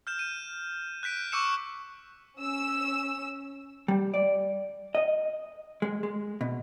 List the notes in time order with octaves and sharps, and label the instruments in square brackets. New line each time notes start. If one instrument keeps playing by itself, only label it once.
[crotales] F6 G6 E7
D#7
F#6 G6 B6 D7
C#6 D6 E6 C#7 E7
[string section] C#4 E6
[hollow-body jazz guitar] G3
D5
D#5
G#3
G#3
B2